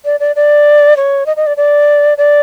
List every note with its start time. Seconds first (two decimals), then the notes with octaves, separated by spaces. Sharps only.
0.05 D5
0.20 D5
0.36 D5
0.97 C#5
1.26 D#5
1.37 D#5
1.47 D5
1.57 D5
2.18 D5